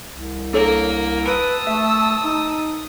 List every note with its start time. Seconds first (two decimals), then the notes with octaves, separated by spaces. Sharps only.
0.12 C2
0.53 A#3 D4 A4 C#5
1.27 B4 A5 D#6 E6
1.67 A3 E5
2.24 D#4